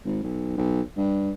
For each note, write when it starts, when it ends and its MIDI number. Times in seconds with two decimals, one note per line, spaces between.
0.05 0.19 32
0.23 0.55 35
0.58 0.81 35
0.97 1.31 43